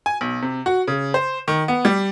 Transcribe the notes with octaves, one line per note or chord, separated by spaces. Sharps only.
G#5
B1
C3
F#4
C#3
C5
D#3
B3
G3